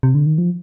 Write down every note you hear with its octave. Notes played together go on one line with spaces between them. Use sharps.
C3
D3
D#3
F3